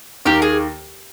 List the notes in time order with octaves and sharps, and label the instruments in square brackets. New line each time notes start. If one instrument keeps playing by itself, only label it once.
[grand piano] D#2 D#3 A#3 [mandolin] G4 A#4
[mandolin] G#4